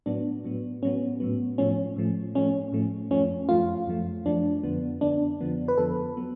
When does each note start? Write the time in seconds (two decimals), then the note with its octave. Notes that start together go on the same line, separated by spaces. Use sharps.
0.06 A2 F#3 B3 D4
0.45 A2 F#3 B3
0.82 A2 F#3 B3 C#4
1.20 A2 F#3 B3
1.58 A2 F3 A3 C#4
1.96 A2 F3 A3
2.35 A2 F3 A3 C#4
2.72 A2 F3 A3
3.11 F#2 F3 A3 C#4
3.49 F#2 F3 A3 F4
3.87 F#2 F3 A3
4.26 F#2 F3 A3 D4
4.63 F2 D3 F3 B3
5.01 F2 D3 F3 B3 D4
5.40 F2 D3 F3 B3
5.68 B4
5.78 F2 D3 F3 B3 A4
6.17 F#3 B3